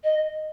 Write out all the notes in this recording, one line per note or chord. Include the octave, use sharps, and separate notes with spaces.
D#5